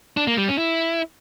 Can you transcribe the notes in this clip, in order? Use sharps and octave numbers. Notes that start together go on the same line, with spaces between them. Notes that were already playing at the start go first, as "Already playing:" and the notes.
D4
A#3
G3
C#4
E4